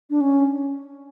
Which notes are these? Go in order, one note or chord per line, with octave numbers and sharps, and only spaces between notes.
D4
C#4